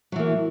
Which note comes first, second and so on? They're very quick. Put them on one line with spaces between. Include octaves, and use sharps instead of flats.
F#3 E3 A#3